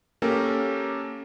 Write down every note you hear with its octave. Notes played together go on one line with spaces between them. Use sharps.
A#3 C#4 G4 A4 A#4